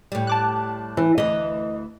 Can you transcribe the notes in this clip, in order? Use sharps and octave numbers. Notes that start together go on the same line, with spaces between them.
A2 G3
A5 D6 F#6
E3
D2 E3 D#5